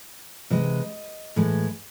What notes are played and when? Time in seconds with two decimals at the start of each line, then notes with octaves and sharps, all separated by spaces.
0.50 C3 E3 G#3 D#5
1.36 A2 E3 G#3